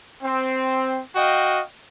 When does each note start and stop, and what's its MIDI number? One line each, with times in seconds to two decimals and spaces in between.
0.23 1.01 60
1.15 1.62 66
1.15 1.62 75
1.15 1.62 77
1.15 1.62 79